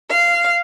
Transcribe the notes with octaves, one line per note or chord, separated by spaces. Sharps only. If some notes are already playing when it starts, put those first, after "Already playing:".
F5